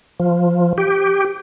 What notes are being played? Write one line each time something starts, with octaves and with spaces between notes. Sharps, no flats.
F3
G4